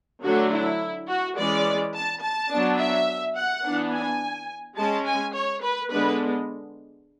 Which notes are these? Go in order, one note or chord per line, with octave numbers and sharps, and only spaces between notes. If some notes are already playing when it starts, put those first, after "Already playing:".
D3 F#3 A3 D4 F#4
E4
F#4
E3 G#3 C#4 D5
A5
A5
F#3 B3 D4
E5
F#5
E3 B3 D4
G#5
G#3 C#4 A5
G#5
C#5
B4
D3 G#3 B3 D4 B4